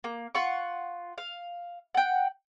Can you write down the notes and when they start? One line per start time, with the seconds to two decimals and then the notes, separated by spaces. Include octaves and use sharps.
0.04 A#3
0.35 F4 F#5 C#6
1.18 F5
1.94 F#5 G5